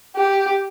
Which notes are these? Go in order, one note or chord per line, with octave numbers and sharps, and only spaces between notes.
G4